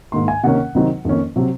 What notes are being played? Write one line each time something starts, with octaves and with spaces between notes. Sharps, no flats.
G#2 D#3 A#3 C6
G#5
C3 D#3 A#3 C#4 F#5
C3 D#3 F#3 C4 D#4
F2 D#3 A#3 C#4
C3 F#3 C4